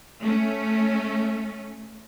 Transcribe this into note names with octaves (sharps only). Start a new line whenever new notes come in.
A3 C#4